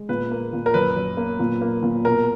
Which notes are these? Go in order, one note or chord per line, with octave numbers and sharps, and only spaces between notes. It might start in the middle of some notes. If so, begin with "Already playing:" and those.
Already playing: G#3
A#2 B4
A#3
A#2
A#4
F#2 B4
F#2
A#3
A#2
A#3
A#2
B2 A#4